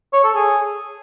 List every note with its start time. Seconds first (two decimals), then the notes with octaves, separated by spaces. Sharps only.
0.13 C#5
0.24 A4
0.35 G#4